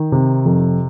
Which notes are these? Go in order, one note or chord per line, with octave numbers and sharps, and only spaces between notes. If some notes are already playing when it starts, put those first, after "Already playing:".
Already playing: D#3
C3
F2